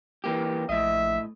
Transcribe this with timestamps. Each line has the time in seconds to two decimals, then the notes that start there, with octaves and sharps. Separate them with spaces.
0.24 E3 A#3 G4
0.69 A#1 A2 D#5 E5